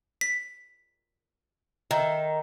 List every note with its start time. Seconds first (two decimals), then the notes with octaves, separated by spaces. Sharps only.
0.21 B6
1.91 D#3 E5